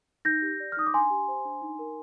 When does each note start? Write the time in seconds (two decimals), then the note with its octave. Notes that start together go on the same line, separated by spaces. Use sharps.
0.25 D#4 G6 A#6
0.42 G4
0.60 D5
0.72 F6
0.77 D#4 D#6
0.87 D6
0.94 D4 G#5 C6
1.10 G4
1.28 C5
1.45 D4
1.62 D#4
1.79 A#4